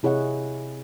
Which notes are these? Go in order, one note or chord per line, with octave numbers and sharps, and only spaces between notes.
C3 E4 G#4 C#5 D#5 F#5